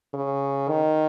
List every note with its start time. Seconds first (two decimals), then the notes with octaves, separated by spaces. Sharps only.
0.14 C#3
0.69 D#3